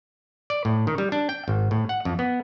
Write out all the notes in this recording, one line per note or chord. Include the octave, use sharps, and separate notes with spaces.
D5
A2
D#3
G3
D4
G5
G#1
A2
F#5
F2
B3